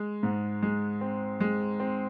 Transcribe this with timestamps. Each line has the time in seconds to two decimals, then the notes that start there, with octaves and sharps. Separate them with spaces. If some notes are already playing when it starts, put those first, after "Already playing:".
Already playing: G#3
0.23 G#2
0.63 G#3
1.01 C4
1.41 G#3
1.80 C4